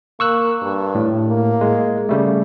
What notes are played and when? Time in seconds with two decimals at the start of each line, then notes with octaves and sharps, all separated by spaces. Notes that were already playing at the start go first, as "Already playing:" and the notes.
0.20 A#3 C#6 E6 F#6
0.62 G2
0.95 A2
1.28 A#3
1.61 G#3
2.09 C#3 G3 A3